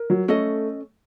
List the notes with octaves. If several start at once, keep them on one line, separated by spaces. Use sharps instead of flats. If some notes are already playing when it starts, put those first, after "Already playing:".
Already playing: A#4
F#3
A3 C#4 A4 D#5